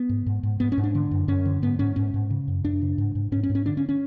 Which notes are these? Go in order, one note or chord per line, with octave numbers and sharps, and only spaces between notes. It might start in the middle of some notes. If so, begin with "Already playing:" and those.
Already playing: B3
G#2
G#2
G#2
G#2 B3
C#4
G#2
D4
D3
F#2
F#2 C#4
D3
G#2 B3
G#2 C#4
G#2 C#4
G#2
C#3
F#2
F#2 D4
C#3
G#2
G#2
G#2 C#4
C#4
G#2
C#4
D3 D4
C#4
C#4